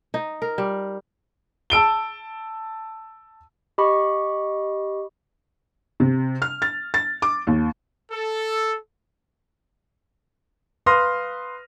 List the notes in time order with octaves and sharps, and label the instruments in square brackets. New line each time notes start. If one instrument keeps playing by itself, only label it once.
[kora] D#4
A#4
G3
[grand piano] A5 E6 D7 G7
[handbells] G4 D#5 B5 C#6
[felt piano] C3
F6
A6
A6
D6
D#2
[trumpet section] A4
[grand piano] B4 F5 C6 D#6 F6 A#6